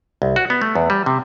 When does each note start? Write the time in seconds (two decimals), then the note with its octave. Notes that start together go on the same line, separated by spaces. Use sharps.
0.22 C2
0.36 F#4
0.50 B3
0.62 A3
0.75 E2
0.90 G3
1.06 C3